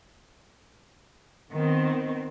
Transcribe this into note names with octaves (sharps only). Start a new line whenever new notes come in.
D#3 B3 C4